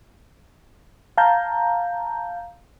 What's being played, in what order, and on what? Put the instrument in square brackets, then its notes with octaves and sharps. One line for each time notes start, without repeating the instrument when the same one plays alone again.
[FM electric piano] F5 A5 A#5 G6